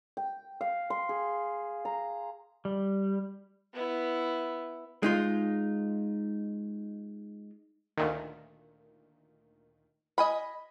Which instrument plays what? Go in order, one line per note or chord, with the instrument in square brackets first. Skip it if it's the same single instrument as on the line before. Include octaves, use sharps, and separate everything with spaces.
[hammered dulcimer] G5
F5
C6
G#4
A#5
[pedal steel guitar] G3
[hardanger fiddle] B3 E4
[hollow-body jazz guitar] G#3 D#4 F4
[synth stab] D2 A#2 D#3
[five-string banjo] D#5 G#5 B5